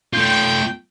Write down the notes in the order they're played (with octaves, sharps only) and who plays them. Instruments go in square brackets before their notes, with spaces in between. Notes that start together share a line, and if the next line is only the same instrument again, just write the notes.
[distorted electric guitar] A3 F4 [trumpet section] G5